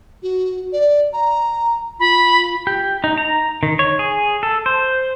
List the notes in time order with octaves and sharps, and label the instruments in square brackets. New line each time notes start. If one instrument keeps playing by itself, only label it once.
[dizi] F#4
D5
A#5
[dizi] F4 [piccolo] B5
[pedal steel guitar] G4
D#4
A#5
D#3
C#5
G#4
A4
C5